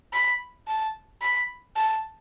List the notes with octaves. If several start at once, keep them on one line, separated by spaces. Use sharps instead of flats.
B5
A5
B5
A5